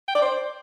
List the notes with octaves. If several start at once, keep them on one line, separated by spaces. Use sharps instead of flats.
G5
D5
C5